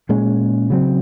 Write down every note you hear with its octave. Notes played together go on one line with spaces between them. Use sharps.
A#2 G#3 C#4
C#3 F#3 C4